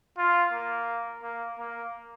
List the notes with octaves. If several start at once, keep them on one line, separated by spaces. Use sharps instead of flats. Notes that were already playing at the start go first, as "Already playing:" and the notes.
F4
A#3
A#3
A#3